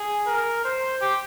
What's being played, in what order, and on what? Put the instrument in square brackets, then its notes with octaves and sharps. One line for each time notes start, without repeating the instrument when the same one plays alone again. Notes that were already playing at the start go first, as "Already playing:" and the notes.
Already playing: [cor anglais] G#4
[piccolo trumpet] A#4
C5
[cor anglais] G4